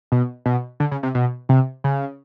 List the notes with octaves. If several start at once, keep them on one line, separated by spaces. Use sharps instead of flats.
B2
B2
D3
C#3
C3
B2
C3
C#3